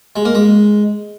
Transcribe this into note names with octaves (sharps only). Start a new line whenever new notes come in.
G#3
A#3
G#3